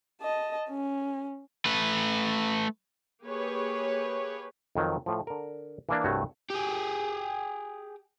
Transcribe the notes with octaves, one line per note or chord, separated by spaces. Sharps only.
D#5 A5
C#4
A3 B4
A#3 G4 G#4 B4 C#5
F2 D#3 F#3
A2 F3
D3 A#4
E3 A#3 D4
C2 G2 A3 F#4 C#5
G4 G#4